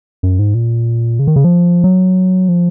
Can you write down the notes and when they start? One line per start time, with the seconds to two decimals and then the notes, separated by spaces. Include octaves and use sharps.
0.23 F#2
0.39 G#2
0.54 A#2
1.19 C#3
1.27 D#3
1.36 C#3
1.44 F3
1.84 F#3
2.49 F3